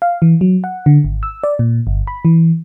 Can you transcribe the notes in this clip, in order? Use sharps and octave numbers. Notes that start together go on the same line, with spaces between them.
F5
E3
F#3
F#5
D3
G#1
E6
D5
A#2
G1
B5
E3